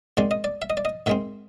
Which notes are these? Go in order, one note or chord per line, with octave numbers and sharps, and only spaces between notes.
G#2 D#3 G#3 C4 D5
D#5
D5
E5
D#5
D5
D#5
G#2 D#3 G#3 C4 E5